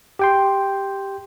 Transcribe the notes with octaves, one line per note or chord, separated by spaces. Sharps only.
G4 G5 C6